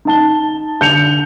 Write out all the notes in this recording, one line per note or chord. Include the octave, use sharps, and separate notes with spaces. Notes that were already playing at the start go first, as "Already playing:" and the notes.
D#4 A5 G7
D3 G6 C#7 F7